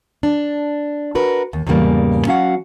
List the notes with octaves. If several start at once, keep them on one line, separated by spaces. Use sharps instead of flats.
D4
F#4 A#4 B4
D#2
E2 G#2 C#3 G3 A#3
F#3 C#4 F#4 F5 F#5